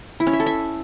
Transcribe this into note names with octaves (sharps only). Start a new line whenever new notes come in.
E4
C#4
E5
A4
E5